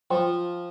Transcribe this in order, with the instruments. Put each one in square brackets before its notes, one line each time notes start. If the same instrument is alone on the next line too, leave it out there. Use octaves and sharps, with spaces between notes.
[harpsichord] F3 [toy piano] C5 G5 C6